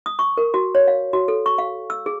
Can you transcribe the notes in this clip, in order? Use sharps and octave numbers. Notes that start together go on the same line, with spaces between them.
D#6
C#6
A#4
F#4
C#5
F5
F#4
A4
C#6
F5
E6
G#4